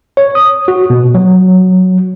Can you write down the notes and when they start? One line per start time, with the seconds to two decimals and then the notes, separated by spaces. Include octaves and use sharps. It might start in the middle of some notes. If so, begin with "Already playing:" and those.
0.17 C#5
0.35 D#6
0.68 F#4
0.90 B2
1.15 F#3